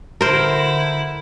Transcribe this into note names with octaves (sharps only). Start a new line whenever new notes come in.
D3 E4 A#4 C5